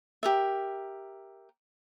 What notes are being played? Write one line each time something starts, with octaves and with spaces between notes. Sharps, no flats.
G4 A#4 E5